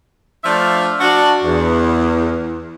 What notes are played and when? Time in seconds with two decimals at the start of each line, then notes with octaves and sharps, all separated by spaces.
0.44 F3 A3 D4 F4 E5 F5
1.00 D4 F#4
1.44 E2